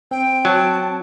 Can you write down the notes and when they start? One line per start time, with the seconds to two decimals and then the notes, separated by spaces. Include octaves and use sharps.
0.11 C4 G5
0.45 F#3 A5